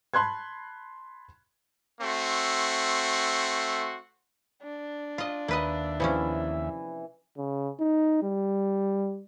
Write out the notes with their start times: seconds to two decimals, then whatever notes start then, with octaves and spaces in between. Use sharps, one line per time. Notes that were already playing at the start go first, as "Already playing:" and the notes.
0.14 A5 B5 C6 F#6 G#6
2.01 A3 C4 F#4 C6
4.63 D4
5.18 F4 D#5
5.48 D#2 A#3 B4 D#5 E5
6.00 C3 E3 F3 C#4
7.38 C#3
7.80 D#4
8.23 G3